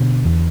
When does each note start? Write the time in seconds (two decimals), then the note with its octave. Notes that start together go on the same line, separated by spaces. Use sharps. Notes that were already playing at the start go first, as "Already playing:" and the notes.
Already playing: B2 D3
0.25 E2